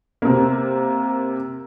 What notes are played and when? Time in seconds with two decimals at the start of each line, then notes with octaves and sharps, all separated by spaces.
0.22 C3 A#3